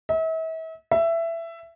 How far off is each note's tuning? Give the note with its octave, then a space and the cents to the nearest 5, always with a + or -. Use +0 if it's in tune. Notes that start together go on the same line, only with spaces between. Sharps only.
E5 -40
E5 +15